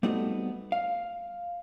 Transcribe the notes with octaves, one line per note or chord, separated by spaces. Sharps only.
G3 A3 B3 C4 D#4 F#4
F5